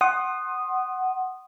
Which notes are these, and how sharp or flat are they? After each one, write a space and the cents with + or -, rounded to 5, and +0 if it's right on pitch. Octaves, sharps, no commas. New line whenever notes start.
F#5 +15 C6 +20 D#6 -10